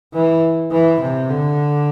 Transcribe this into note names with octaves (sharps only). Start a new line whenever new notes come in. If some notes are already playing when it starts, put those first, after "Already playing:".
E3
E3
C3
D3